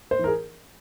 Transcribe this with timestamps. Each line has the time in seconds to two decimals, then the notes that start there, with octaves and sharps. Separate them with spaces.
0.11 C5
0.19 E3 A#4
0.27 G#4